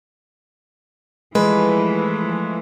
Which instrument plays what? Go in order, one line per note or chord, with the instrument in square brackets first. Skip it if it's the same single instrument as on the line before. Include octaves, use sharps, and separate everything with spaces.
[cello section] E3 F3 A3 [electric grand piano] G#3 [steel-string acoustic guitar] B4